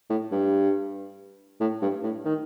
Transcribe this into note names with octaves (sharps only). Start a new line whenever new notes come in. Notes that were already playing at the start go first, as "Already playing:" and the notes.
A2
G2
A2
G2
A2
D#3